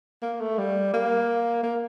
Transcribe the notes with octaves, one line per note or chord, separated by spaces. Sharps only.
A#3
A3
G3
A#3
A#3